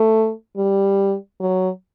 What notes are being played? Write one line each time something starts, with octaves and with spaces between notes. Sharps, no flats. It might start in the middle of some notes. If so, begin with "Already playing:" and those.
Already playing: A3
G3
F#3